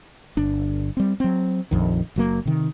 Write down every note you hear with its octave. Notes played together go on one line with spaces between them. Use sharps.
G1 D4
G3 C4
F#3 C4
A#1 F2 D#3
F#1 F#3 A#3
C3 D#3